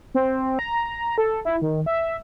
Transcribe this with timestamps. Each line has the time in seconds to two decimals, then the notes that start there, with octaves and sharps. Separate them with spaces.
0.14 C4
0.59 A#5
1.18 A4
1.45 E4
1.62 D#3
1.86 E5